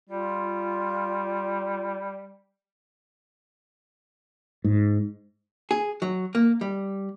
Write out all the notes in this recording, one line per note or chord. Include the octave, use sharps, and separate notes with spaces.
G3 F4
G#2
G#4
F#3
A#3
G3